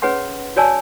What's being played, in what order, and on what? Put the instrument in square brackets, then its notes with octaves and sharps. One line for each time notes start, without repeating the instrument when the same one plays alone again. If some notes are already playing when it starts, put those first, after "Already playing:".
[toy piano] C#4 G#4 B4 C#5 F#5 C6
F#4 C#5 D5 G#5 A5 E6